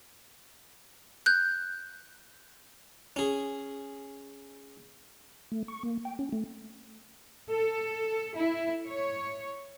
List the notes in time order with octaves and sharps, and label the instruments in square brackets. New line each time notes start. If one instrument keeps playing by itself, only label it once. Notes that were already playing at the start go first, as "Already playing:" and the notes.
[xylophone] F#6 G6
[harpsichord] C#4 G#4
[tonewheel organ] A3
C#6
A#3
G5
C#4
A3
[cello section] A4
E4
C#5